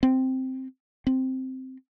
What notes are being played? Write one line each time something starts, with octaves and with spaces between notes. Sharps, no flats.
C4
C4